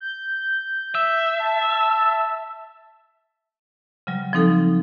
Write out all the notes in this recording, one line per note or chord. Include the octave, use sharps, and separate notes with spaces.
G6
E5
A5
C#3 F#3 G3
F3 C4 D#4 A4